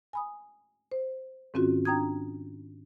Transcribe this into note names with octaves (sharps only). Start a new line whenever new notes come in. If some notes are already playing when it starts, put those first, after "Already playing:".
G#5 B5 D#6
C5
G#2 D#3 C4 C#4 F4 F#4
D4 G5 A#5 D#6 G#6